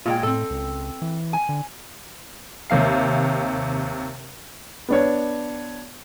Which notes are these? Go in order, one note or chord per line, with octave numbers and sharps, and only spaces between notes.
A#2 G#3 F4 G5
A2 C4 A4
C#2
E3
G#5
D3
D#2 C3 F5 C7
B3 D4 C#5